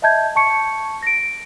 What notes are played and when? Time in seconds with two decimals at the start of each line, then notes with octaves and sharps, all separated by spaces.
0.02 D#5 E5 A5 G6 G#6
0.36 A5 C#6 C#7
1.03 A#6 D7